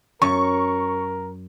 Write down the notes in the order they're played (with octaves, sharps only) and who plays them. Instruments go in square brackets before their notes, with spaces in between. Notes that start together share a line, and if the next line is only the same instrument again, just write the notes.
[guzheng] F#2 [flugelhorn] A#4 [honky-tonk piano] C#6